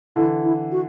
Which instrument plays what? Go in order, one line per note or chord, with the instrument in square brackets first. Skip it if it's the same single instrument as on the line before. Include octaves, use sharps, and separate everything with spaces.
[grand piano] D3 E3 [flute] E4
[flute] E4
F#4